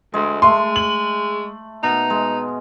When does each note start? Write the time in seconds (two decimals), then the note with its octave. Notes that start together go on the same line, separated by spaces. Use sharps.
0.14 D2 G#3
0.42 G#3 A3 C6
0.76 F#7
1.83 B2 D#4
2.10 G#3